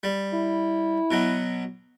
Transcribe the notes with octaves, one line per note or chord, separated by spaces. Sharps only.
G3
E4
B2 F#3